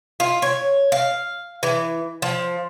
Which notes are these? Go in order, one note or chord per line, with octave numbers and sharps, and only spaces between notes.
F4
C#5
F5
E3
F3